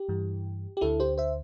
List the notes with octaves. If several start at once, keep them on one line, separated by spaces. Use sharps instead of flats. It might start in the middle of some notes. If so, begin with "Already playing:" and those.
Already playing: G4
G2 E3
G4
D2 D3 E4 A4
G4 C5
C5 E5